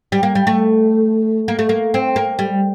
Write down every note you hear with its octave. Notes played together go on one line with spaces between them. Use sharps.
G3
A#3
G3
A3
A#3
A3
A#3
C4
A#3
G3